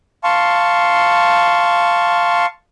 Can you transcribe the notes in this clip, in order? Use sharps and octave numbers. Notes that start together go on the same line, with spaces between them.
F5 A5 C6 C#6